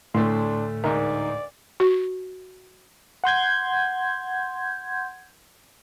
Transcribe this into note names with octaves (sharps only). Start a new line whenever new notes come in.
D2 A2 A3 D4 C6
D2 G#2 D#4 A#4 D5
F#4
F#5 C6 G6 G#6